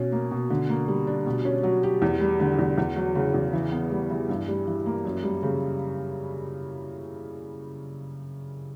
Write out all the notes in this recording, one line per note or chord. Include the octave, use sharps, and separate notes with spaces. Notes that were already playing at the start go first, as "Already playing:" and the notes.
Already playing: B2 C#4
A#3
B2
D3
A#3
G3
D4
B2
C#4
F#3
G4
E2
G3
D3
E2
E2
F#3
C#3
E2
E3
B3
G3
E3
G2
G3
E3
A#3
F#2
G3
C#3